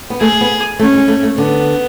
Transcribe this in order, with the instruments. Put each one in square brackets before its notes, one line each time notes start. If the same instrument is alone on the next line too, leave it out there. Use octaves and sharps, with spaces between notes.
[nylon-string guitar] B3
[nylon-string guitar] A3 [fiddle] G#4
[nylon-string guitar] B3
[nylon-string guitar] A3 [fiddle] C#4
[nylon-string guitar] G#3
A3
A3
[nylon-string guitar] D3 [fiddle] B3